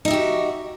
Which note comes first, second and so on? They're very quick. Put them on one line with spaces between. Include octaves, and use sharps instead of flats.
D#4 E5 G4 F#4